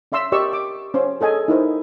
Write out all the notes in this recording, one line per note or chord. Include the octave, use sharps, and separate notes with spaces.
C#4 D5 E5 C6 E6
G4 A#4 D5 D#5 C#6 E6
D6
C#4 C5 C#5 C6
G#4 A4 D#5 G#5
D#4 E4 A#4 C5